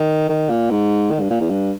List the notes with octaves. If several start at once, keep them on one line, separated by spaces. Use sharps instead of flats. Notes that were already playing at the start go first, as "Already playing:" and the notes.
Already playing: D#3
D#3
A#2
G#2
D#3
G2
A#2
E2
G2